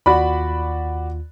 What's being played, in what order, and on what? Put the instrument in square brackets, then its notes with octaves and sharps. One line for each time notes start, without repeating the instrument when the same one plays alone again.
[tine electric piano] D#2 F4 [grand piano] F#4 D5 B5